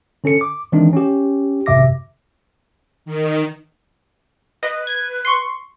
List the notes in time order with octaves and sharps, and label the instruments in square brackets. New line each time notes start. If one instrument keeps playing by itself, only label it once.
[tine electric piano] D3 C#4 A4 C#7
D6
D#3 E3 G#3 C4 D4 D#4
C#4 G4
G#1 F#2 C3 E5 D6 A#6
[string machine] D#3
[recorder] B4 [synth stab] D#5
[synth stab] G#6
C6 C#6